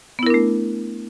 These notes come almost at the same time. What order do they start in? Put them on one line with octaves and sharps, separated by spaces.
B3 E4 A#4 D4 A3